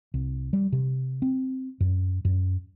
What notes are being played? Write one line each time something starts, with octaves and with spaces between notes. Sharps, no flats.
C2
G3
C3
C4
F#2
F#2